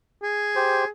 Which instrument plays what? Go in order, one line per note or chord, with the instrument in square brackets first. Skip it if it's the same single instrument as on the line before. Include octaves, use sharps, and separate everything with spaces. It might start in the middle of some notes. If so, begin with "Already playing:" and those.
[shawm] G#4
[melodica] G4 C5